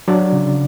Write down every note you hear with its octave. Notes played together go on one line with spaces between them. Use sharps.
F#3 D4 D5
C#3